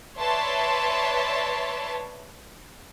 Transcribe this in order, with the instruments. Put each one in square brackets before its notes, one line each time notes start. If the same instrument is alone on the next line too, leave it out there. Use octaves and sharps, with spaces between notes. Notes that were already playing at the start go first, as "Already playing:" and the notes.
[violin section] B4 C#5 D5 E5 A5 C6